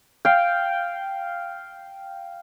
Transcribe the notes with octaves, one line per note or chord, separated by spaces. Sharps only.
F5 G5